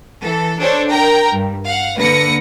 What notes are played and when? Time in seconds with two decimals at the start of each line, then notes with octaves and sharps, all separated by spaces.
0.21 E3 A4
0.58 D4 A4 C5 C#5
0.89 A#4 G5 A#5
1.33 G2
1.66 F5 F#5
1.96 D3 A#3 B4 A#6 C#7